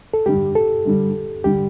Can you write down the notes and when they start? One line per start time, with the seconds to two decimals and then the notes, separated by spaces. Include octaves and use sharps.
0.14 A4
0.26 G2 D3 G3 G4
0.56 A4
0.85 G2 D3 G3
1.44 D3 G3 G4